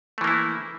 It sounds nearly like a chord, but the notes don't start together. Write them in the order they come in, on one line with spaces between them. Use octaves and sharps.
A3 E3 A#3 E4